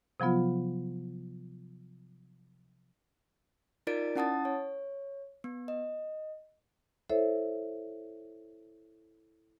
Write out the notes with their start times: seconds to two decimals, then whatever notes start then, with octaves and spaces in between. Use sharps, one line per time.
0.20 C3 F3 F#3 B3 F4
3.87 D#4 F4 A#4 D5 A6 D7
4.16 C#4 E4 F#5 A5 D#6 A6
4.45 C#5
5.44 B3
5.68 D#5
7.10 E4 A4 C5 C#5 E5